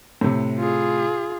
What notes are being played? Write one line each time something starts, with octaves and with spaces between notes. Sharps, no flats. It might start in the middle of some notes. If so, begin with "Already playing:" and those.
A2 C3
F4 G#4